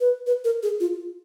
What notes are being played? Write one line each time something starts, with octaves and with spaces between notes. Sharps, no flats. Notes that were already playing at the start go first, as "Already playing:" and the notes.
B4
B4
A#4
G#4
F4